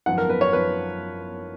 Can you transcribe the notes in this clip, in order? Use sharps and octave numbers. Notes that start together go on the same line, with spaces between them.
G#1 F#2 F3 B3 F#5
A#4
B4
C#5
G#1 F#2 F3 B3 B4